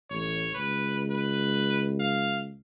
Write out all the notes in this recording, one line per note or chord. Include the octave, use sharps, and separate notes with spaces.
A1 C#5
C#2 B4
B4
F5